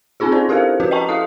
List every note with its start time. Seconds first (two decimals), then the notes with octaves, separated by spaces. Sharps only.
0.20 C4 C#4 D#4 F4 G#4
0.32 D4 E4 C5 D5
0.49 E4 G4 A4 A#4 C5 F5
0.80 F3 C#4 F#4 B4
0.91 D#5 E5 G5 A5 A#5 C#6
1.08 E4 A4 F5 D#6 C7